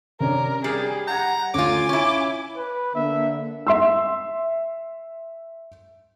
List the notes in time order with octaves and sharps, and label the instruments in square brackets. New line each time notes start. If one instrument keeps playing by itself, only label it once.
[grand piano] C3 C#4 D4 [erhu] A#4
[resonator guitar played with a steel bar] G3 [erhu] G#4 [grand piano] F6 C7 F#7
[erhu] F#5 [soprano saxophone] A#5 [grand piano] G6 G#6
[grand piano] D2 [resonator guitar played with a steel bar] C#4 F4 [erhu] G#5 [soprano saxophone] D6
[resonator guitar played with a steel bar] C#4 E4 [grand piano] C#6
[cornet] B4
[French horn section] D3 A#3 [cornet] E5
[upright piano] E5 C6 E6